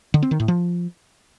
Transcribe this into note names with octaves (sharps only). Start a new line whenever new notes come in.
D3
C4
D#3
A2
F3